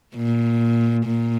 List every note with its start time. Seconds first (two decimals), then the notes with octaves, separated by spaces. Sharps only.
0.16 A#2
1.06 A#2